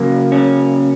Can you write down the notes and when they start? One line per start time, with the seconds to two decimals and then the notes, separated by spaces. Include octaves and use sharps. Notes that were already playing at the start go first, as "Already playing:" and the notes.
Already playing: C#3 F#3 A#3
0.32 C#4